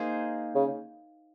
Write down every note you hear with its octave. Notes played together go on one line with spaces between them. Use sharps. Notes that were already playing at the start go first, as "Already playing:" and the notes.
Already playing: A#3 D#4 G#4 C5
C#3